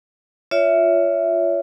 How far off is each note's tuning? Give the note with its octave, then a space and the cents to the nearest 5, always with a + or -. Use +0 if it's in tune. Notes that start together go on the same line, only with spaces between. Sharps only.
F4 +0 C#5 +25 E5 +0